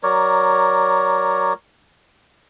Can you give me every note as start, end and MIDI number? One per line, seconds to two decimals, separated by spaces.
0.03 1.53 54
0.03 1.53 70
0.03 1.53 73
0.03 1.53 74